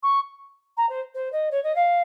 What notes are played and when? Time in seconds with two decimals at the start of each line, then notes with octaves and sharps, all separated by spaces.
0.03 C#6
0.77 A#5
0.89 C5
1.14 C5
1.32 D#5
1.51 C#5
1.64 D#5
1.76 F5